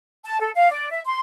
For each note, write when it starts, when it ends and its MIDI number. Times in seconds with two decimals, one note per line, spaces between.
0.25 0.40 81
0.40 0.49 69
0.55 0.71 77
0.71 0.89 74
0.92 1.01 76
1.05 1.20 84